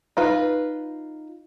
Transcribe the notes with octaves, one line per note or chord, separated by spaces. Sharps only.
D#4 F4 B4